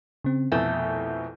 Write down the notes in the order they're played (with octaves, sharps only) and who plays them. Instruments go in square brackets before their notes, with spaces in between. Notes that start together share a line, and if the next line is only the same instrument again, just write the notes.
[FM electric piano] C#3 C4
[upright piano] C2 F2 B2 [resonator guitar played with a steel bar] A3 [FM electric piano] G#5 G6